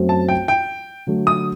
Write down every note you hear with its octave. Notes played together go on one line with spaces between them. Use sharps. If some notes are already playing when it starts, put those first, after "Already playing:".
Already playing: F#2 F#3 A3 C4 F#4
A5
G5
G5
D3 F#3 A3
D#6